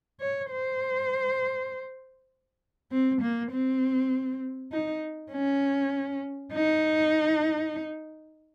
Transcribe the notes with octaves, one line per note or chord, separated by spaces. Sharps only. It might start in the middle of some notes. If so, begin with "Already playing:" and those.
C#5
C5
C4
A#3
C4
D#4
C#4
D#4